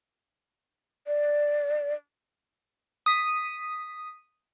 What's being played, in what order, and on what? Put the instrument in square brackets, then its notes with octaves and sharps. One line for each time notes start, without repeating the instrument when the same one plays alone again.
[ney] D5
[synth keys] D#6 B6